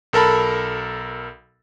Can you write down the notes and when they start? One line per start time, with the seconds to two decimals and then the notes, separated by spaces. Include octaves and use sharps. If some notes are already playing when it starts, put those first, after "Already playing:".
0.13 B1 A4 A#4 A5 B5